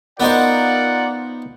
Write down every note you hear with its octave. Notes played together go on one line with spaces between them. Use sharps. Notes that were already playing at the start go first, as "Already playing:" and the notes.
B3 D#4 F4 A#4 C5 D5 F#5